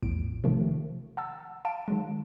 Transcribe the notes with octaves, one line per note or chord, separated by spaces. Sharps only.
A#1 E2 A2 D7
C3 D#3 F3 A3
F#5 A5 E6
F5 A5 D7 E7
D#3 F#3 G#3